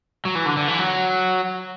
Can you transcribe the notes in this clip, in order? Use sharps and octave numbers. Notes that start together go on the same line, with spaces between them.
F#3
E3
D3
D3
E3
F#3